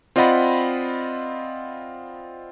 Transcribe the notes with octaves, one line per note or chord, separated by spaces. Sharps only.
C4 F4 D5 D#5 F#5 B5